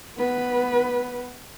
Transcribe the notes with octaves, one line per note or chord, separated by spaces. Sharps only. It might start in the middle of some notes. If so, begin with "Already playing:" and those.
B3 B4